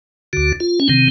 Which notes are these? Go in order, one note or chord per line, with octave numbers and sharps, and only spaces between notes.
D2 D3 F#4
F4
C#4
C3 D#3 C4